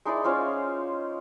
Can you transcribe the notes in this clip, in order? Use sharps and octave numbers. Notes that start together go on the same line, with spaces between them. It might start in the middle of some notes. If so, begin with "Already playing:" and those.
G#3 D#4 E4 D5
C#4 F4 C5 F5